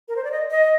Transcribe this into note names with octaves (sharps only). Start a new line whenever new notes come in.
A#4
C5
D5
D#5
D#5